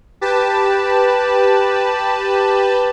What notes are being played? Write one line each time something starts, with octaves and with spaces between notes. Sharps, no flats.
G4 B4 A5